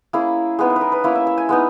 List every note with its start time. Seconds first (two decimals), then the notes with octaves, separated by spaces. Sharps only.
0.13 A#3 C#4 E4 G#4
0.59 G#3 B3 D#4 G#4
0.70 A#4
0.76 B4
0.81 A#4
0.92 B4
1.04 A#3 C#4 E4 C#5
1.15 E5
1.27 E5
1.38 G#5
1.49 G#3 B3 D#4